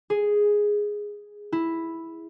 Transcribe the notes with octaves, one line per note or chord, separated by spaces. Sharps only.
G#4
E4